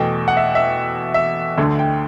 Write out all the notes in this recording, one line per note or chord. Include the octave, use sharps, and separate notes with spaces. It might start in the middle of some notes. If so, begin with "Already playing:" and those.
Already playing: E2 B2 A3 G5
F#5
E5
E5
E5
D2 D3 A3
G5